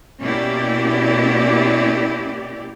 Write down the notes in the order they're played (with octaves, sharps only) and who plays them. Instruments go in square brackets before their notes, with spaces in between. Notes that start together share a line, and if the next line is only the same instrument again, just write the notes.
[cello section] B2 A#3 C#4 E4 G4 D5